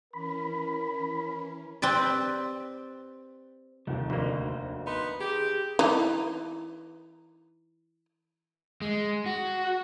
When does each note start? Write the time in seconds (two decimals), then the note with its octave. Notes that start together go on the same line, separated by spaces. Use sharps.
0.13 E3 C#4 A#4 B5
1.82 C4 G4 B4 D5
3.87 F1 D#2 F3 C4
4.10 D2 A#3 D#4 F#4 C5
4.87 B3 D#4 C6
5.21 G4 G#4
5.79 E3 D#4
8.82 G#3
9.26 F#4